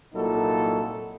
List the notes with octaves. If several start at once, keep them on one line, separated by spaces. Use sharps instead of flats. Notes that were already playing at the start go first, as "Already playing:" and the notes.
C2 A#2 F#3 D#4 E4 A4